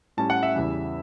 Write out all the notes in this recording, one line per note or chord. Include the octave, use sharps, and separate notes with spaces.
A2 G3 C#4 A5
F#5
E5
E2 C#3 E3 G3